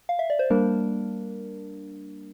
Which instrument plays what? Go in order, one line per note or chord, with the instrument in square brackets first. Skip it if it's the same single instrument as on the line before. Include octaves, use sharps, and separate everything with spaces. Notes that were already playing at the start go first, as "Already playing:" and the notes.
[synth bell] F5
E5
D5
C5
G3 A#3 D4 A#4